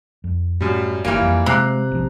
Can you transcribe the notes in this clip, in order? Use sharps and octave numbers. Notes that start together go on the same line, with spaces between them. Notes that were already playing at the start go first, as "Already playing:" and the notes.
F2
F#2 A2 G3
G1 E3 G3 A#3 F4 G#5
F2
C3 G#3 A#5 F#6 C7
A1 F3